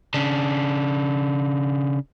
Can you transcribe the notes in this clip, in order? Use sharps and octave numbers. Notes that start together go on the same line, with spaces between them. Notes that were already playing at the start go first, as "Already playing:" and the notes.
C#3 D4